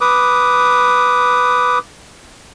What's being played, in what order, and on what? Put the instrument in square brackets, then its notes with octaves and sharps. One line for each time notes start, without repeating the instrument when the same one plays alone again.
[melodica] B4 D6 D#6